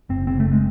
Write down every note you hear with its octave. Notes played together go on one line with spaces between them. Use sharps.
F#1 C4
C#3 C4
F#1 A3
G#3